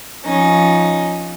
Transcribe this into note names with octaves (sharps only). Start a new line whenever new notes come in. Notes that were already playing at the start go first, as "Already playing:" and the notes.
F3 C#4 D#4